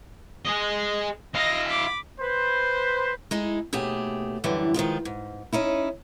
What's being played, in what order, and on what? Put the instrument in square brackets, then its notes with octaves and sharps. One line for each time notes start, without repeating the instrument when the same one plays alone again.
[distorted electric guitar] G#4 D#5
[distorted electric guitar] E4 F5 [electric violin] D#5 A#6
[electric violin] B5 D6
[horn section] B4 C5
[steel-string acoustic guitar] G#3 D#4 E4
D#2 B2 A3 G4 G#4
F#2 D3 E3 G3
D#3 F3 G#3 F4
G#2
C#4 D#4 E4